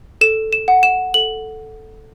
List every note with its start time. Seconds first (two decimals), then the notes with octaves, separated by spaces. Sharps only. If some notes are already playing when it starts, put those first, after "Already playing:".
0.21 A4 E7
0.53 E7
0.68 F#5
0.83 E7
1.14 A4 F#7